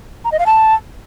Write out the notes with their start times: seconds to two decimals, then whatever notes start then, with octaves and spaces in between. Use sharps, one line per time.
0.25 A#5
0.32 D#5
0.39 F5
0.46 A5